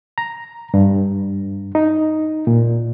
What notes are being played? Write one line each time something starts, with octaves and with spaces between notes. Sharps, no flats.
A#5
G2
D#4
A#2